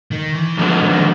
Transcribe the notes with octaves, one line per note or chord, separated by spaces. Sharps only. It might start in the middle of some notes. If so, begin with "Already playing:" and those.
D#3
E3
F2 D3 F3 F#3 G#3 B3
D#3